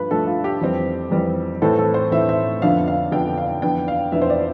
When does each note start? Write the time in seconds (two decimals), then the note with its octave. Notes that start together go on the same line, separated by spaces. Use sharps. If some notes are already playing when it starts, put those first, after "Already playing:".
Already playing: G2 F3 A3 B4
0.11 G2 F3 A3 D4 A4
0.27 F4
0.44 G4
0.61 F2 E3 G3 C4
1.11 F2 E3 G3 C4
1.62 A2 E3 A3 C4 A4
1.79 A4
1.94 C5
2.11 A2 E3 A3 C4 E5
2.29 E5
2.62 F2 D3 F3 B3 D4 F5
2.88 F5
3.12 F2 D3 F3 B3 D4 G5
3.37 F5
3.62 F2 E3 B3 D4 G5
3.88 F5
4.12 F2 E3 B3 D4 E5
4.22 C5
4.30 D5